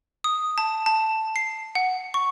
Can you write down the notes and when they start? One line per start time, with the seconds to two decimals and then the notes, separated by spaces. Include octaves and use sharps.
0.24 D#6
0.58 A5
0.86 A5
1.36 C7
1.75 F#5
2.14 C#6